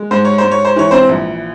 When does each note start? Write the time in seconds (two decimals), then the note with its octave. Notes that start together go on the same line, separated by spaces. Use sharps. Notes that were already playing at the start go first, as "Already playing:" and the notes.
Already playing: G#3
0.11 G#2 C5
0.25 C#5
0.38 C5
0.44 G#2
0.51 C#5
0.65 C5
0.76 E3 C#5
0.91 C4 C5
1.09 A#1